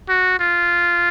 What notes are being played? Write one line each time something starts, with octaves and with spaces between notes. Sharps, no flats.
F#4
F4